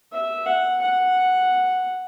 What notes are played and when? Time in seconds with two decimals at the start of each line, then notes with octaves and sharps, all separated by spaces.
0.12 E5
0.45 F#5
0.81 F#5